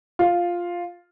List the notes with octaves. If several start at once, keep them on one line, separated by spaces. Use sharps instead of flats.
F4